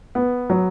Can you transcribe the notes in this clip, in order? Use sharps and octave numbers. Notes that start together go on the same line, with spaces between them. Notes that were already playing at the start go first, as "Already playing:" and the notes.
B3
F#3